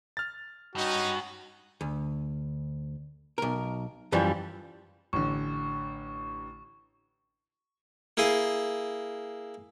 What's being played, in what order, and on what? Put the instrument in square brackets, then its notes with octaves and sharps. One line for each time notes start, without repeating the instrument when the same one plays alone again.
[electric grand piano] F6 A6
[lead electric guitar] G2 [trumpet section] C#4 D#4 [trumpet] F#4
[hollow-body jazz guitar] D2
B1 A#4
F#2 E3 F3 G3
[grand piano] A1 D3 [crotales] C#6
[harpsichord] A#3 E4 G#4 C6